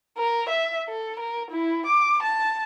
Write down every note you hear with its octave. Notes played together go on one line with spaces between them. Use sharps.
A#4
E5
A4
A#4
E4
D6
A5